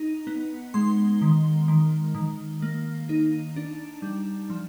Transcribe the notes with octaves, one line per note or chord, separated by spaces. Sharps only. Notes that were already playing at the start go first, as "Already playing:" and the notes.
Already playing: D#4
B3
G#3 C6
D#3
D#3
D#3
A#3
D#4
D4
G3
F3